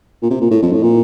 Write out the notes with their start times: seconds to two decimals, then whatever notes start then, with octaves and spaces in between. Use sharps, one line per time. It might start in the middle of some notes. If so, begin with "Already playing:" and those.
0.22 A#2
0.30 C3
0.41 A#2
0.51 A2
0.62 F2
0.72 A2
0.83 A#2